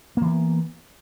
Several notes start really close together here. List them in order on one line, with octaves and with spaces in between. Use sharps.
A#3 E3 B3